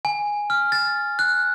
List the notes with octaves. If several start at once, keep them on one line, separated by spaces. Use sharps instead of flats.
G#5
F6
A6
F#6